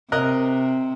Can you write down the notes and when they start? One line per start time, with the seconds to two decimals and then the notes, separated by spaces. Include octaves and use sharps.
0.12 C3 A#4 D#5 F#6